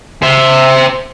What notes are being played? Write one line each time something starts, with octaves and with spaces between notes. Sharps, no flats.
C5 E5